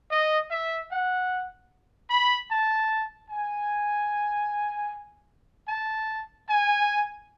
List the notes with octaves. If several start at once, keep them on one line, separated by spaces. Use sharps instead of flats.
D#5
E5
F#5
B5
A5
G#5
A5
G#5